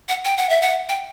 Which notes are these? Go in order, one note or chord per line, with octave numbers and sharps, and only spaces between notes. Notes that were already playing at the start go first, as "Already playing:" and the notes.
F#5
G5
F#5
E5
F#5
G5